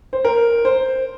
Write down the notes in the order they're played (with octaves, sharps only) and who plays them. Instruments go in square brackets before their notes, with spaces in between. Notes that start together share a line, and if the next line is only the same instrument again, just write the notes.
[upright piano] C5
A#4
C5